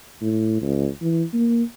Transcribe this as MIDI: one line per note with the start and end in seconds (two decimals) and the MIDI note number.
0.21 0.59 45
0.61 0.88 37
1.01 1.23 52
1.34 1.63 58